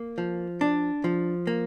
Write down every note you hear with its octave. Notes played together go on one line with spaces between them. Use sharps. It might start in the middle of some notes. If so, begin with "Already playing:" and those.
Already playing: A#3
F3
D4
F3
A#3